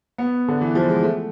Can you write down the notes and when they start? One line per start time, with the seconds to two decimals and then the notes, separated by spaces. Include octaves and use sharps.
0.18 B3
0.48 D3
0.61 E3
0.75 F3
0.88 G#3
1.03 A3